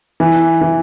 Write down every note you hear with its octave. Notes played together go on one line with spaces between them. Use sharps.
E3
E3